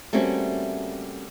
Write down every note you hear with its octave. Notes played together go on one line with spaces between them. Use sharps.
G3 A3 A#3 C4 C#4 F#4